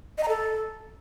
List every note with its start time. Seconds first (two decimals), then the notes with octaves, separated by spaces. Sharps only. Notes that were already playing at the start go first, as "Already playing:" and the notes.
0.18 D#5
0.23 A#5
0.28 A4